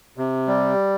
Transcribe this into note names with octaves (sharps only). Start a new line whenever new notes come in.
C3
G3